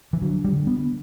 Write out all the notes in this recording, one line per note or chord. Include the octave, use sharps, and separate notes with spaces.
E3
D3 F#3
G3
D3
B3